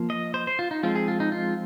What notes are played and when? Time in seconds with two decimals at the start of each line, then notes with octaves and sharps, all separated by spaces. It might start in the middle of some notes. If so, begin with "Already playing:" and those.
Already playing: F3 A#3
0.10 D#5
0.34 C5
0.47 C5
0.59 F4
0.71 D#4
0.83 F3 G#3 C4 F4
0.95 G#4
1.08 F4
1.20 D#4
1.32 F4